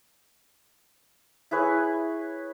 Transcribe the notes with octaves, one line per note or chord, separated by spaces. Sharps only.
E4 G#4 B4 C#5